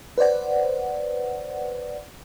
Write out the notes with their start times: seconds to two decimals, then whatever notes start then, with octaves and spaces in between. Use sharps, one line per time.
0.18 B4 C5 D5 F#5